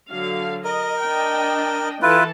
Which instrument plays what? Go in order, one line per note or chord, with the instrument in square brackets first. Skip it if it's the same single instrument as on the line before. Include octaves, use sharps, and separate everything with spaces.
[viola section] D3 F#3 F5
[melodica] A#4 [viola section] D#5
[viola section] D4 D#5 G5
[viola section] E3 A4 A5 [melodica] E4 F4 B4